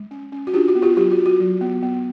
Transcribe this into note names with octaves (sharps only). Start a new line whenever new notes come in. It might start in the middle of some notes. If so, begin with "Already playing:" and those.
Already playing: G#3
C#4
C#4
F#4
D4 F4 G4
F#4
B3
F4 G4
F#3 F4 G4
F#4
F4
F#4
F#3
B3
B3